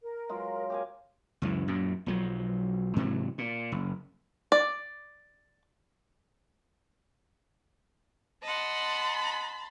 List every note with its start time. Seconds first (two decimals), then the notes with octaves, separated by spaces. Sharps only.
0.03 A#4
0.29 F#3 G#3 F4
0.70 G4 F5 G#5
1.42 C#2 F#2 E3
1.68 F#2 A#2
2.06 B1 F3 F#3
2.96 G#2 C3 E3 F#3
3.38 A#2
3.72 F#1
4.52 D5
8.43 D#5 F#5 A5 B5 C6